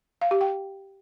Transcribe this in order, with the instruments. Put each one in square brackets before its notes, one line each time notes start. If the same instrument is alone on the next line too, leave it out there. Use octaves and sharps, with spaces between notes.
[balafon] F5
G4
G5